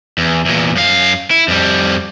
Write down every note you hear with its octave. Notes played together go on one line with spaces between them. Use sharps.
E2
E2 A#2
F#2 F5
E4
F2 G3